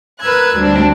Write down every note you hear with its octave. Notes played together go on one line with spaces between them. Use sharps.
A#4 B4 E6 F#6 G#6
D2 G3 C4 D4